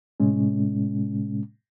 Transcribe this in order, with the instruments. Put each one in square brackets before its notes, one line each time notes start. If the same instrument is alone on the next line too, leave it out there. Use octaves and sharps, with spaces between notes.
[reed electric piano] A2 C3 G#3 C#4